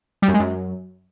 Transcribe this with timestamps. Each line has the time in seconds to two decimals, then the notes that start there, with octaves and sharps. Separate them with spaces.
0.22 G3
0.28 F#2
0.34 G#3
0.40 F#2